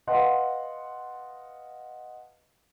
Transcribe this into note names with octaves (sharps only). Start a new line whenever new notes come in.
B4 D#5 F5 F#5 A5 C6